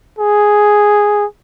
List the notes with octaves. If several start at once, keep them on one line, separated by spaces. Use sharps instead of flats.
G#4